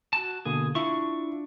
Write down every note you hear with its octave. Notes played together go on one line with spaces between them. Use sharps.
F#4 A5
B2 D3 A#3 G#4
D4 E4 F4 E5 C#6